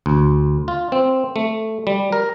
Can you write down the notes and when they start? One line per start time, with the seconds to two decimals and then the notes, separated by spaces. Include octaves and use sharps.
0.06 D2
0.68 F4
0.92 C4
1.36 A3
1.87 G3
2.12 A#4